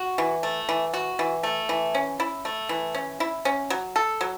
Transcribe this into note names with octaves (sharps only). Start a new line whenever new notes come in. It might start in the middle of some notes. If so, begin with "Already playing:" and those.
Already playing: F#4
E3
A3
E3
F#4
E3
A3
E3
C#4
E4
A3
E3
C#4
E4
C#4
F#3
A4
F#3